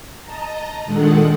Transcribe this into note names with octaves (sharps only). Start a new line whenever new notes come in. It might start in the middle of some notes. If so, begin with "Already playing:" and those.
D#5 A5 A#5
A#2 D#3 G#3 D4 A4 F#5